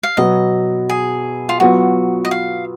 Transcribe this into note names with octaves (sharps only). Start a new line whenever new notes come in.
F5
B2 F#3 B3 D#5
G#4
F4
F#3 B3 F4 F#4
D#5
F5